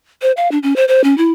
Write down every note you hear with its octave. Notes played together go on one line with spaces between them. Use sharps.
C5
F5
D4
C#4
C5
C5
C#4
E4